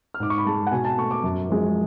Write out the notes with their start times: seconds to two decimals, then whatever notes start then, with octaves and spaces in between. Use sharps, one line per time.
0.14 F6
0.20 G#2 D6
0.30 C#6
0.38 B5
0.46 G#3 A5
0.67 F#5
0.72 B2 G#5
0.85 A5
0.98 A3 C#6
1.11 D6
1.24 F#2
1.50 F3 G#3